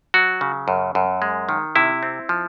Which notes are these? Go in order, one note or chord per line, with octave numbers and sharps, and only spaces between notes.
F#3 F#4
C#3
F#2
F#2
G#3
D#3
C3 E4
C4
F3